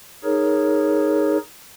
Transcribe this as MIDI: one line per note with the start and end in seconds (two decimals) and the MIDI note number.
0.24 1.37 63
0.24 1.37 68
0.24 1.37 70
0.24 1.37 73